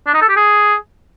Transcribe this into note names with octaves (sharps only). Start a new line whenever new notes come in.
D4
D#4
A4
G4
G#4